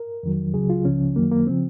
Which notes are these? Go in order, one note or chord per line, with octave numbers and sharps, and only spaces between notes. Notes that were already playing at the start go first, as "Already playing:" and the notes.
Already playing: A#4
F2 D#3 F#3
C#2 C#3 F#3 G#4
F4
C#2 C#3 F3 C#4
F#2 D#3 F#3 A#3
A#3
C#3 F3 C4